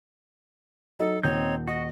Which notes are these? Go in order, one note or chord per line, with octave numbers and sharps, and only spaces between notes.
F#3 D#4 A4 D#5
D#1 C4 D#4 C#5 G6
F#4 D#5